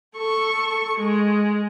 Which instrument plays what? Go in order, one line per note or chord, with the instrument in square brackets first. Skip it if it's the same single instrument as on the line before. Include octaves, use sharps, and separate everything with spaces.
[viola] A4 C#6
G#3